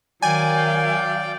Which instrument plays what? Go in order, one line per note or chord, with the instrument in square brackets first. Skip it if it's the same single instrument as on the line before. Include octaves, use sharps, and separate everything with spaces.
[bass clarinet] D#3 [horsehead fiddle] F#3 F5 [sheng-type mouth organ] D5 G5 [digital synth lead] G#5